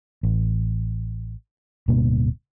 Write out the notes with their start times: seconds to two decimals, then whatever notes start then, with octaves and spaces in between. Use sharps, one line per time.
0.23 A1
1.88 D1 G2 B2 A#3